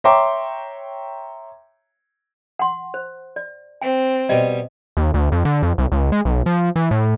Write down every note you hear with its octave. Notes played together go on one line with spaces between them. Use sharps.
C#5 E5 G5 A#5 C6 D6
F#5 C6
C5
D5
C4 G5
B2 G3 D#5
D#2
D2
F2
D3
F2
C2
C#2
G#3
B1
F3
E3
A2